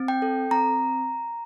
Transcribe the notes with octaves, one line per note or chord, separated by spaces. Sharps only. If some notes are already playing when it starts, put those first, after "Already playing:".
Already playing: C4
G5
A4
C4 A#5